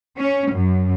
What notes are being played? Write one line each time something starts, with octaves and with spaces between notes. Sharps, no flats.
C#4
F#2